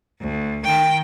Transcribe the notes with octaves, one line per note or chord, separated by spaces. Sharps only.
D2
D#3 G5